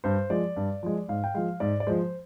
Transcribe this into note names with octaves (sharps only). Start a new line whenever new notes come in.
G2 C5
F3 G#3 D5
G2
F3 G#3
G#2 F5
G5
F3 G#3 F5
G#2 D5
D5
F3 G#3 C5